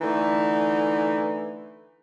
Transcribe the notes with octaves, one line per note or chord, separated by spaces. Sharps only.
D3 E3 A3 D#4